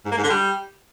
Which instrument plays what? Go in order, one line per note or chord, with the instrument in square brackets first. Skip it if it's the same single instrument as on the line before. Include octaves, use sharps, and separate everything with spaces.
[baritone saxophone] G#2
A#3
G#2
D3
G3